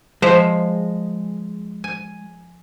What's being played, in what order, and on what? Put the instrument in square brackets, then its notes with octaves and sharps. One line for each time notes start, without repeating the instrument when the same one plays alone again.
[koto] F3 C5 E5 [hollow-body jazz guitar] G#3
[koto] G#5